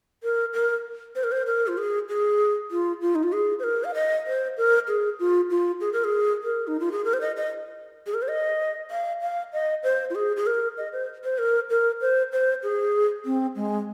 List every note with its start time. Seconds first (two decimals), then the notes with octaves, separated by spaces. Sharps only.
0.23 A#4
0.53 A#4
1.16 C5
1.24 A#4
1.32 C5
1.47 A#4
1.67 F4
1.78 G#4
2.09 G#4
2.71 F4
3.01 F4
3.15 D#4
3.23 F4
3.33 G#4
3.59 C5
3.64 A#4
3.84 F5
3.94 D#5
4.26 C5
4.57 A#4
4.88 G#4
5.19 F4
5.50 F4
5.81 G#4
5.93 A#4
6.04 G#4
6.43 A#4
6.67 D#4
6.80 F4
6.92 G#4
7.05 A#4
7.13 C5
7.21 D#5
7.37 D#5
8.07 G#4
8.14 A#4
8.22 C5
8.28 D#5
8.91 F5
9.21 F5
9.53 D#5
9.83 C5
10.10 F4
10.15 G#4
10.37 G#4
10.47 A#4
10.78 D#5
10.93 C5
11.24 C5
11.38 A#4
11.70 A#4
12.01 C5
12.33 C5
12.63 G#4
13.25 C4
13.56 G#3